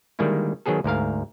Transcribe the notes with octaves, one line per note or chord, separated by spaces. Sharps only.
D3 D#3 G3 G#3 A#3 E4
D#3 F#3 B3 G#4 A4
D2 G#2 A#4 F5